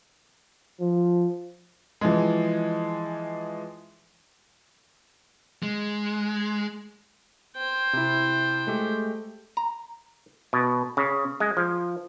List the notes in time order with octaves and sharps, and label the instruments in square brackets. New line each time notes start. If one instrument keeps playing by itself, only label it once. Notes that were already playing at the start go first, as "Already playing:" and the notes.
[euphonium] F3
[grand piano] E3 F3 G#3
[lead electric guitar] G#3
[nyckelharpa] C5 G5
[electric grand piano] C3 E4
G#3 A3 G4
[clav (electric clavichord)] A#5
B2
C#3
G#3
F3